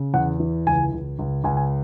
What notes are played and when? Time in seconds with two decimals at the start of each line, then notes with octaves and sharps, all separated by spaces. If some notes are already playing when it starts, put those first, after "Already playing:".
Already playing: C#3
0.14 E2 F#5
0.40 E3
0.67 C#2 G#5
0.92 C#2
1.19 C#2
1.44 C#2 G#5
1.57 G#5